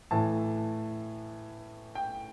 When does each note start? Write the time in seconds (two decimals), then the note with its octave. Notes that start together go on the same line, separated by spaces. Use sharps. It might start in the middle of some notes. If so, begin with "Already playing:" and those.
0.11 A2 E3 A5
1.95 G5